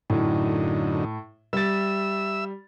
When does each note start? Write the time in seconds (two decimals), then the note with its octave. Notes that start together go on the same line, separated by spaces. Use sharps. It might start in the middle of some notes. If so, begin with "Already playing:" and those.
0.10 F#2 A2 D3 D#4
1.53 G3 E5 E6 A6